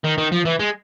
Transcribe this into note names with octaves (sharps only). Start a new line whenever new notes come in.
D#3
D#3
F3
E3
G#3